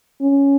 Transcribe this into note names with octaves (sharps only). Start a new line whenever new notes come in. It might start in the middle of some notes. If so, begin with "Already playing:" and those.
C#4